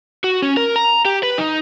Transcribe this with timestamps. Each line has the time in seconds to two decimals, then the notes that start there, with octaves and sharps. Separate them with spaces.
0.24 F#4
0.42 C#4
0.57 A#4
0.76 A#5
1.05 G4
1.23 B4
1.38 D#4